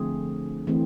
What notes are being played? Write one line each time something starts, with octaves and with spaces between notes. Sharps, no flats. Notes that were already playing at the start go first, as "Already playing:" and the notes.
Already playing: D3 F3 A3 C4 G#4
E3 A3 C4